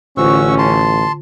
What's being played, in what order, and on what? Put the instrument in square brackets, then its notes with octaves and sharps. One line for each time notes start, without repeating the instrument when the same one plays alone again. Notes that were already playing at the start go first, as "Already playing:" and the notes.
[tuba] A1 [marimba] D3 F4 C5 [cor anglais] C#4 [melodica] F#4 C#6 E6
[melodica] A5 C6